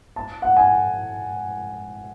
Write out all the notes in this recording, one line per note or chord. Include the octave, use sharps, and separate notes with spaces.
A5
F#5
G#5